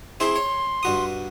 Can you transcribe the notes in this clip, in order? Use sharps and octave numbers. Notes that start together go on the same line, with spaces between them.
C4 E4 G#4 C6
C#5
G2 F#4 D#6